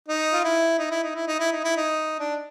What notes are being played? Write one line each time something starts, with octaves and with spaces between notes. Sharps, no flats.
D#4
F4
E4
D#4
E4
D#4
E4
D#4
E4
D#4
E4
D#4
D4